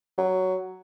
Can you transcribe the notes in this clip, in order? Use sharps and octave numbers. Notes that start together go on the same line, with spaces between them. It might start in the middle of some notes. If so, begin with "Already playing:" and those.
F#3